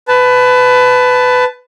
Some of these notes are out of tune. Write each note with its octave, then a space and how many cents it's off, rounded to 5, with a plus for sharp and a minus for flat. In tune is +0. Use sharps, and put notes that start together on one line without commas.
B4 +20 A5 -10